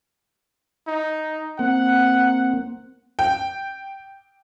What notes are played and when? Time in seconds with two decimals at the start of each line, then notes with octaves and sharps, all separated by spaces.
0.88 D#4
1.59 A#3 C4 F#5
3.19 G5